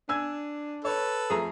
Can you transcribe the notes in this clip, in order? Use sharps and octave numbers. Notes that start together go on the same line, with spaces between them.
D4 G#5 E6 G#6
A4 B4 C#5
F2 A3 G#4 A#5